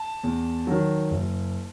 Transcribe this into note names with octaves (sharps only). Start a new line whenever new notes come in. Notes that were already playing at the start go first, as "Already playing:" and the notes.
Already playing: A5
E2
D#3 F#3
F#1